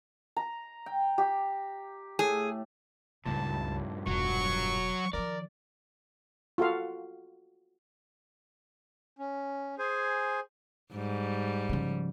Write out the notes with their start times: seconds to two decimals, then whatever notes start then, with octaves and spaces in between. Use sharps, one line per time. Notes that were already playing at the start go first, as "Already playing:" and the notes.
0.36 A#5
0.86 G5
1.18 G4
2.19 A2 G#4
3.26 C#2 G2 A#2 A5
4.07 E1 F#3 C#6
5.13 D#3 F3 A#4 D5
6.58 F4 F#4 A4 F5
9.19 C#4
9.79 G#4 C5 G#5
10.93 G#2 G3
11.69 C#3 F3